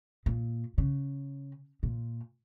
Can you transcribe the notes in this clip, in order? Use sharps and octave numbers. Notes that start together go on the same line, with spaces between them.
A#2
C#3
A#2